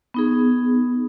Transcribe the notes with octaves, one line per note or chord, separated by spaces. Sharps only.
B3 D#4 G#4